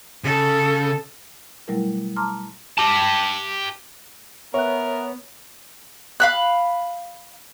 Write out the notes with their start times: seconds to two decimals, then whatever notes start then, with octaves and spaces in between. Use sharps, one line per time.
0.24 C#3 A4
1.68 B2 F#3 G3 A3 E4 A#4
2.16 A5 A#5 C6 D6 F6
2.78 G4 A5
4.54 B3 A#4 C#5 E5 F#6
6.20 F5 B5 F#6